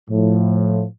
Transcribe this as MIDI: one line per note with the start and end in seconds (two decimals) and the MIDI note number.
0.10 0.85 45
0.10 0.85 53